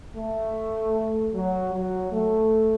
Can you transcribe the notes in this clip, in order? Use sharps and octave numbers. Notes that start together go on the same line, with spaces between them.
A3
F#3
F#3
A3